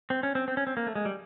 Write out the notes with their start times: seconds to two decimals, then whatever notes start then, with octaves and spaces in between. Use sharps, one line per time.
0.10 C4
0.23 C#4
0.35 C4
0.48 C4
0.57 C#4
0.67 C4
0.77 A#3
0.87 A3
0.96 G#3
1.05 G3